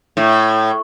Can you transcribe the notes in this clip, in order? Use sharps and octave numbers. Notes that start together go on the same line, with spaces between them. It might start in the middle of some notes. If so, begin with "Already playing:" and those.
A2